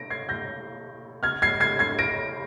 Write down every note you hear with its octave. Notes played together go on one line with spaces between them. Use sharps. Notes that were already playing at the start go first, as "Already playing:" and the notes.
Already playing: A#6 D7
G#6 C7
G6 A#6
F6 G#6
G#6 C7
G#6 C7
G#6 C7
A#6 D7